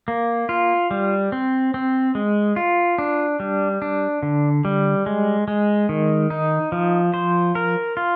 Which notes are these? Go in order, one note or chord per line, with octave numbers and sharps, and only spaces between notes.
A#3
F4
G3
C4
C4
G#3
F4
D4
G3
D4
D3
G3
G#3
G#3
D#3
D#4
F3
C5
A#4
F4